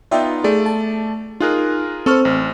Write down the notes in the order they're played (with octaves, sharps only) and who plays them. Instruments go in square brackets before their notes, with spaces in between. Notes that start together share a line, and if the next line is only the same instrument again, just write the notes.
[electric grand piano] B3 D#4 F4 [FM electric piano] D5 E5 G5
[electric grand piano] A3 D5 [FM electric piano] G#4
[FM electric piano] A5
[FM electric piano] D#4 F#6 [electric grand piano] F4 G#4 A#4
[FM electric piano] C4 C5 [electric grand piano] A4 C#6 F6
[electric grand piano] A1